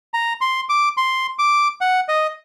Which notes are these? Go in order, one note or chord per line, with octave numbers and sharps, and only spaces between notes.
A#5
C6
D6
C6
D6
F#5
D#5